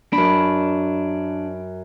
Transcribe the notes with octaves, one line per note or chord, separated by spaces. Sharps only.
F#2 D4 B5